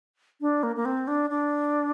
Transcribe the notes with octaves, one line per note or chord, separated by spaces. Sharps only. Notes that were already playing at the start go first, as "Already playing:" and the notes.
D4
A#3
A#3
C4
D4
D4